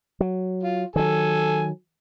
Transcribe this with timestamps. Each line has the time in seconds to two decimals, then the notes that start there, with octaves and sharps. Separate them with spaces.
0.20 F#3
0.63 F4
0.96 D#3 F#3 A4 G#5